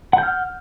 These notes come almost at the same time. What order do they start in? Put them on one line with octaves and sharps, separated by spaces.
F#5 G6 F6